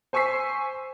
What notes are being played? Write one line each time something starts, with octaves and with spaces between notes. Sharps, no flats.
C5 G#5 C#6 E6 B6 C7